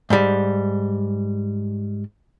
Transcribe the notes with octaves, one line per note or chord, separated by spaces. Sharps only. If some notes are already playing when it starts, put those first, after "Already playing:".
G#2 G3